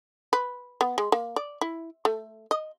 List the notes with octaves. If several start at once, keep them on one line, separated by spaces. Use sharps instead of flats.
B4
B3
G#3
A#3
D5
E4
A3
D#5